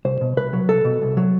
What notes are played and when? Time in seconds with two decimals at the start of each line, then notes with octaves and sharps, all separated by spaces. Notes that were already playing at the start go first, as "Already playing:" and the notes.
0.05 C2 C5
0.21 B2
0.37 C2 B4
0.53 F#3
0.69 C2 A4
0.85 B2
1.02 C2
1.17 F#3